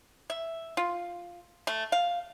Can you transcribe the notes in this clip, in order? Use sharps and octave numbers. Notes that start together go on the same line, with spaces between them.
E5
F4
A3
F5